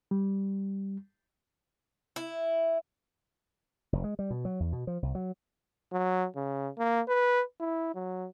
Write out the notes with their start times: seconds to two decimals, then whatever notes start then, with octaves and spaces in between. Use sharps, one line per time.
0.11 G3
2.16 E4
3.93 F1
4.04 G#3
4.19 G3
4.30 B2
4.45 F#3
4.60 E2
4.73 B2
4.87 F3
5.02 C2
5.15 F#3
5.92 F#3
6.36 C#3
6.78 A#3
7.08 B4
7.60 E4
7.95 F#3